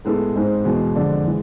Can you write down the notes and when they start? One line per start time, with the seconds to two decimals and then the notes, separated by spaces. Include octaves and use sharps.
0.05 A2 G#3 B3 E4 A4
0.35 G#2 G#3 C4
0.64 E2 B2 G#3
0.95 F2 D3 G#3 D4
1.26 E3 G#3